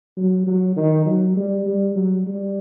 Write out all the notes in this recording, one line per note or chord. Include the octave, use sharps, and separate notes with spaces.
F#3
F#3
D#3
F#3
G3
G3
F#3
G3